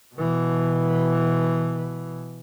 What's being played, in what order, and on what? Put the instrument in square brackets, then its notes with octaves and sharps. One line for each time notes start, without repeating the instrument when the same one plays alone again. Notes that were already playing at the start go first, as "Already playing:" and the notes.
[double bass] B2 E3